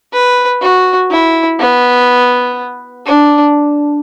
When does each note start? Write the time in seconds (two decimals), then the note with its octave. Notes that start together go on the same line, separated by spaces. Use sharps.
0.13 B4
0.61 F#4
1.11 E4
1.60 B3
3.06 D4